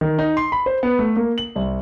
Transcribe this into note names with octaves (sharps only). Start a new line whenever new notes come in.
D#3
D#4
C6
B5
C5
B3
A3
A#3
F#7
C2